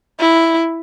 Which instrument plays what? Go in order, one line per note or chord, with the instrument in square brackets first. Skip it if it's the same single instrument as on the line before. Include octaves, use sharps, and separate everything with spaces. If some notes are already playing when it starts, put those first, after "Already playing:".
[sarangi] E4